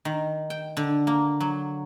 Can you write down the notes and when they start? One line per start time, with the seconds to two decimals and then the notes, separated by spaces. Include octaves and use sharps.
0.05 D#3
0.50 G5
0.77 D3
1.07 A#3
1.40 F#3